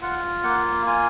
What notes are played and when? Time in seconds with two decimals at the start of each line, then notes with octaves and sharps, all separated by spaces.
0.01 F4 F#5
0.43 A#3 F#5
0.86 F4 G#5